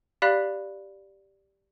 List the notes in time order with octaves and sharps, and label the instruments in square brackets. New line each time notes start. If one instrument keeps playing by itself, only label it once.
[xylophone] G4 D5 F5 B5 F#6 B6